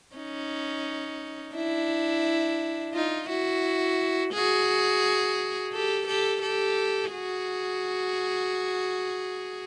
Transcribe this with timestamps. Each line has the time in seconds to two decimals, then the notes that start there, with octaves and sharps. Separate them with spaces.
0.16 C#4 D#4
1.54 D4 E4
2.94 D#4 F4
3.29 E4 F#4
4.33 F#4 G#4
5.72 G4 A4
6.07 G4 A4
6.41 G4 A4
7.12 F#4 G#4